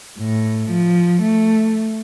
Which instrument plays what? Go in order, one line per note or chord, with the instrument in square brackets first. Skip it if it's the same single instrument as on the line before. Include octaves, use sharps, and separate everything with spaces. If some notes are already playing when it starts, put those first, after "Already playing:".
[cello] A2
F3
A3